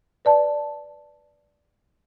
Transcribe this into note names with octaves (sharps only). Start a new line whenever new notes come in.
B4 D5 A5